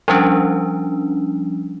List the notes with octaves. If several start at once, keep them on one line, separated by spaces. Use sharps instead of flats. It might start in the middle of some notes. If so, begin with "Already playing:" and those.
F3 G3 C#4 D4